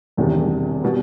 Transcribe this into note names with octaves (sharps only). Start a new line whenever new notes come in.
E1 E2 C3 D#3 G3
B2 G3 B3